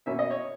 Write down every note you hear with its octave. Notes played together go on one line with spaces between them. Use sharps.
B2 A#3 C#4 E5
D#5
C#5